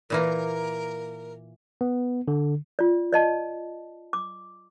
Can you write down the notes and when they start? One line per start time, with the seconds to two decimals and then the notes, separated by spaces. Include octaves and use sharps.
0.10 A#2 E3 A#3 A#4
1.81 B3
2.28 D3
2.79 F4 D5
3.13 D5 D#5 A5
4.13 D6